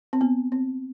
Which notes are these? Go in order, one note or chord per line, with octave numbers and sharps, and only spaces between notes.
C4
B3
C4